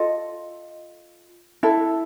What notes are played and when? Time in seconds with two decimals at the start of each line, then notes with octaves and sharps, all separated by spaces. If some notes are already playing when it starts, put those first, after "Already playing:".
Already playing: F4 A4 D#5
1.63 E4 A4